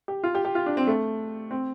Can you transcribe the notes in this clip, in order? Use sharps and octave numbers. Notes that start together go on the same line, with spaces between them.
G4
F4
G4
G4
F4
D4
C4
A3
C4